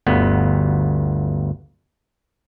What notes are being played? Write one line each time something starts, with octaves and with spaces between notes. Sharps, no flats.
G1 D2 B3